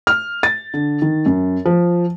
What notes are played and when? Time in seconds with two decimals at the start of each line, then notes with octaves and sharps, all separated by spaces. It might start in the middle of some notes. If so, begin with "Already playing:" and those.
0.07 F6
0.43 A6
0.74 D3
1.02 D#3
1.26 F#2
1.66 F3